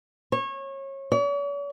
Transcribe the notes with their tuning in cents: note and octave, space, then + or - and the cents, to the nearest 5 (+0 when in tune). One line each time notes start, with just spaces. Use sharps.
C#5 -25
C#5 +45